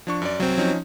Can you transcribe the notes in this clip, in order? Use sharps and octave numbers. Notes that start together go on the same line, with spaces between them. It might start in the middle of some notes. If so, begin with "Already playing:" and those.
F3 D4 C#6
F#2 D5
C2 F#3 C4
F3 C#4 D#4